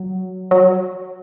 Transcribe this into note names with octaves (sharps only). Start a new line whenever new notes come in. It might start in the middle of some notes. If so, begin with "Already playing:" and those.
Already playing: F#3
F#3